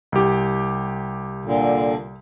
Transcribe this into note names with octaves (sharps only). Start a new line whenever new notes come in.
C2 G4
A#2 D3